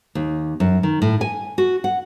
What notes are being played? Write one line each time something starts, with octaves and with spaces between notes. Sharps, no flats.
D#2
F#2
D#3
A2
G#5
F#4
F#5